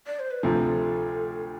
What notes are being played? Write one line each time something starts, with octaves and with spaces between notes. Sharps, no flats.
D5
C5
B4
D2 C3 F3 A4